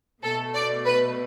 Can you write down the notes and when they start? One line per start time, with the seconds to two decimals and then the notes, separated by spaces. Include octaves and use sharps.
0.23 B2 A3 A4
0.54 D5
0.85 B4